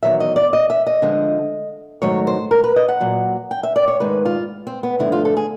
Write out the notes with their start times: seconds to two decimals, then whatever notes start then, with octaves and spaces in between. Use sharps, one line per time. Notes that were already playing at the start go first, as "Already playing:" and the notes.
0.03 E2 C3 D#3 F#3 E5
0.20 D#5
0.36 D5
0.53 D#5
0.70 E5
0.87 D#5
1.02 F2 D3 F3 G#3
2.02 G#2 D#3 F#3 A3 C#5
2.27 C5
2.51 A#4
2.64 B4
2.76 D#5
2.88 F#5
3.01 A#2 F#3 A#3
3.51 G5
3.63 E5
3.76 D5
3.88 C#5
4.00 G#2 D#3 G#3 B4
4.25 F4
4.67 C4
4.83 B3
4.99 G2 D3 F3 A3 E4
5.12 F4
5.25 A4
5.37 G#4